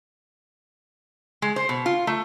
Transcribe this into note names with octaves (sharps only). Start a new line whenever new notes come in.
G#3
C5
B2
F4
A3